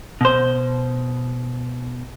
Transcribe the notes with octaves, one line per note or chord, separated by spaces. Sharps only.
B2 C5